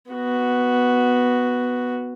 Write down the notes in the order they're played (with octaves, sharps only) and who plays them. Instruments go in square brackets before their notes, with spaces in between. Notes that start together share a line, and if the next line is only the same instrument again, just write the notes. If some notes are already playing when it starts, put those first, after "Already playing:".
[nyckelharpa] B3 F#4